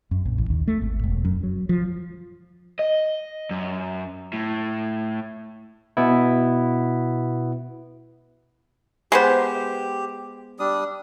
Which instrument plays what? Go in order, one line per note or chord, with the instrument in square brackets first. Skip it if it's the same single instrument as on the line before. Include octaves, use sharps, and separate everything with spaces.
[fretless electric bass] F#2
A#1
A1
D#2
A3
G#1
E1
F#2
F#3
F3
[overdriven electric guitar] D#5
F#2
A2
[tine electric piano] B2 B3 E4
[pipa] G#3 B3 C5 [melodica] G4
[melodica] G3 D4 D#6